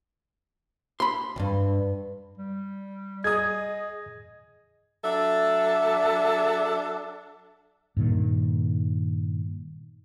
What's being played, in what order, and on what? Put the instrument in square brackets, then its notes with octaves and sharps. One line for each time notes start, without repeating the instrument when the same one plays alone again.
[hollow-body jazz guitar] B5 C6
[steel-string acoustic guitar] D2 G2
[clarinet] G3
[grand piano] G#4 D#6 [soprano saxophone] D#5 [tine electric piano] G#6
[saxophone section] F#3 D4 A4 E5
[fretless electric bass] G2 A#2 D#3